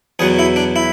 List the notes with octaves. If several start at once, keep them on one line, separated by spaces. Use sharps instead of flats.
E2 B2 F#3 G#4
E4
D4
E4